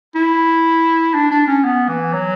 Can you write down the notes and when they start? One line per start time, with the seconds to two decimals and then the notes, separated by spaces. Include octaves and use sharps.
0.16 E4
1.15 D4
1.31 D4
1.48 C#4
1.64 B3
1.89 E3
2.13 F#3